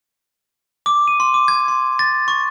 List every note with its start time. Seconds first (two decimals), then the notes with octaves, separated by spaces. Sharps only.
0.86 D6
1.08 D#7
1.20 C6
1.34 D6
1.48 G#6
1.68 C6
1.99 A6
2.28 C#6